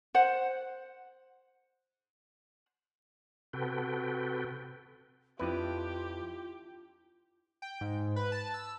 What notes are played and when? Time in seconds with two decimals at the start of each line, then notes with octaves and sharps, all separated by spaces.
0.15 C5 F#5
3.53 C3 F#4 A4 B4 G5
5.39 F2 D4 E4 F4 G4 B4
7.62 G5
7.81 G#2
8.16 B4
8.32 A5
8.54 E6